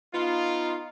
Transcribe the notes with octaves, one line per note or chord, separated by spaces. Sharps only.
B3 D#4 F4